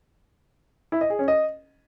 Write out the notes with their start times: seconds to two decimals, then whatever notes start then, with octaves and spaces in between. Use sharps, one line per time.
0.92 E4
1.01 D#5
1.10 G#4
1.19 C#4
1.28 D#5